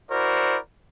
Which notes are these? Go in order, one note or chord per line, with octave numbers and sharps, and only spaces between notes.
E4 F#4 A#4 C5 D5